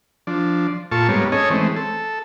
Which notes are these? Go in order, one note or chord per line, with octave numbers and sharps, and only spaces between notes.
F3 D4
A#2 F4 A4 A5 C#6
G#2 G3 A#3 B3 C#5
C#4 G#4 A4 C#5 D#5
E3 G#3 A3 C4
A4